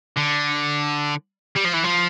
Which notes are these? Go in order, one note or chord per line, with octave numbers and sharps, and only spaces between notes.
D3
G3
F3
E3
F3